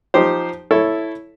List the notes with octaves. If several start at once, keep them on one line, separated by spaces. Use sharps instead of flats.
F3 D#4 G4 C5
E4 A4 C#5